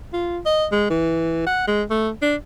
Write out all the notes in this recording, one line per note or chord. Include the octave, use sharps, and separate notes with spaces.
F4
D#5
G#3
E3
F#5
G#3
A3
D4